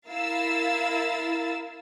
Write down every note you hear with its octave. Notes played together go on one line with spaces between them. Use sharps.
E4 A#4 F5 E6 A6